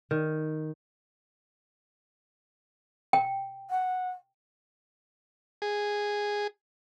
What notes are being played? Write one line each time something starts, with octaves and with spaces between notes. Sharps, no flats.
D#3
G5
F#5
G#4